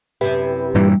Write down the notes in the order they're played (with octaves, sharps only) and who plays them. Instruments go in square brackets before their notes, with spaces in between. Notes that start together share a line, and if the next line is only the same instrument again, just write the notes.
[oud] F#2 C3 E4 [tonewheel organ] G4 B4
[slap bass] G2 A#2 E3 [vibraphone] G3